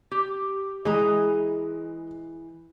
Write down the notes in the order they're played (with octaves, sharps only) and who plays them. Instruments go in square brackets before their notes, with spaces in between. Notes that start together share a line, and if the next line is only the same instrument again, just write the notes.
[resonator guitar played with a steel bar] G4
[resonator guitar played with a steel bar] E3 D#5 A#5 [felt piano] G#3